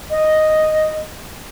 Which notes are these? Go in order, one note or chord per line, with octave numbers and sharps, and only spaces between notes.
D#5